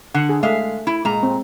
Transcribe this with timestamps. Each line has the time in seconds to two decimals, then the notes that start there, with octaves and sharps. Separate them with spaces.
0.15 D3 F#5
0.29 G#4
0.43 G#3 A3 E5 F5
0.87 E4
1.05 A#2 G#3 A#5
1.23 C4